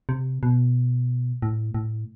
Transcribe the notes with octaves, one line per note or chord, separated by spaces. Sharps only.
C3
B2
A2
A2